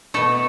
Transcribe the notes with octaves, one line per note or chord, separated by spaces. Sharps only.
B2 A3 A4